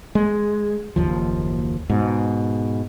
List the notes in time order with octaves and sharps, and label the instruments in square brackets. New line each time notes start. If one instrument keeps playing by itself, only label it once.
[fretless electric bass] G#3
F#1 D#2 F3
G#2 B2